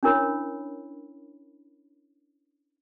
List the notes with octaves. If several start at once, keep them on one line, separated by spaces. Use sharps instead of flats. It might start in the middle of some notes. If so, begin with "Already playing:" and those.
C#4 D4 E4 A#4 C#5 B5